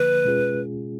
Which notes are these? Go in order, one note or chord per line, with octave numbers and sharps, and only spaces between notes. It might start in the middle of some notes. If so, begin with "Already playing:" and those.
Already playing: D3 F3 A#3 B4
B2 G#3 C#4 F4 G#4